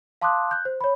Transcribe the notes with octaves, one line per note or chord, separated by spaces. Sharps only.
F5 A5 C6 D6 D#6 F#6
F#6 G6
C5
C#5 B5